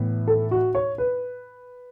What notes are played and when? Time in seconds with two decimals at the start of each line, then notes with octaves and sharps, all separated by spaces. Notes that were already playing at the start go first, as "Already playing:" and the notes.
Already playing: A2 E3 B3
0.27 A4
0.51 F#4
0.75 C#5
0.98 B4